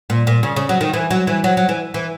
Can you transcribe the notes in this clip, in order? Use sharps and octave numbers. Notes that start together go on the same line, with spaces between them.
A#2
A#2
C#3
C#3
F#3
D#3
E3
F#3
E3
F#3
F#3
E3
E3